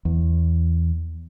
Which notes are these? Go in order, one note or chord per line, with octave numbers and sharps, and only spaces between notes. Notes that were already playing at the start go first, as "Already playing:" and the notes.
E2